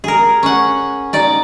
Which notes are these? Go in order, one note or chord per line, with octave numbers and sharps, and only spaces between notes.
G#4 A#4
C#4 F#5
D#4 D5